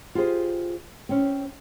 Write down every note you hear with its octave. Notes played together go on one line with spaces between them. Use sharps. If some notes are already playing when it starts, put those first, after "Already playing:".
F4 G4 G#4 C5
C4 C#4